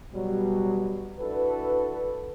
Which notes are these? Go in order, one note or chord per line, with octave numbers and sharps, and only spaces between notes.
B2 F#3 G3
D4 E4 F#4 A4 B4